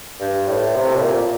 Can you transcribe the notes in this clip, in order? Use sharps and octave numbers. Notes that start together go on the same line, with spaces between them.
G2
A2
C3
A2
A#2